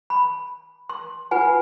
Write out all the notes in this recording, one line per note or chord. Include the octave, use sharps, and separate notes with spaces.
B5
C6
F4 B4 F#5 G#5